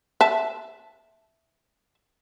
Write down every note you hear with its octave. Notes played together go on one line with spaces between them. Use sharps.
E5 A5